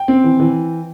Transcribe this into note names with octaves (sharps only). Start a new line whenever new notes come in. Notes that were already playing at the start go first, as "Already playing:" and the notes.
Already playing: G5
C4
E3
E3